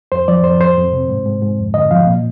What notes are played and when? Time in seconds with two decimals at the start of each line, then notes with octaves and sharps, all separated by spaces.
0.12 F2 C5
0.28 F3 D5
0.44 F2 C5
0.60 F2 C5
0.78 F2
0.93 C3
1.09 G#2
1.26 G#2
1.42 G#2
1.58 F2
1.74 D3 D#5
1.91 F3 F5
2.07 A#2